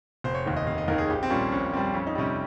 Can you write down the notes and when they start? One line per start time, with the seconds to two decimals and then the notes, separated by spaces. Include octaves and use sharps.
0.24 F1 C5
0.34 C#5
0.46 D#2 D#3
0.56 D#5
0.67 F1 F5
0.78 D#5
0.88 D#2 D#3 A#4
0.98 G#4
1.10 A#1 G4
1.23 C4
1.30 A#2 G3 C#4
1.52 A#1 C#4
1.72 A#2 G3 C4
1.94 F2 C#4
2.07 D#4
2.15 C3 G3 C#4